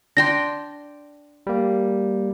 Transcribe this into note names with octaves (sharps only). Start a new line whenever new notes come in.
D4 G5 C6 A#6
G3 A#3